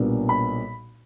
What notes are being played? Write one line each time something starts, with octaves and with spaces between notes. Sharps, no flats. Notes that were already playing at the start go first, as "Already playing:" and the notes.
Already playing: B1 A#2 G3 B3 D4
B5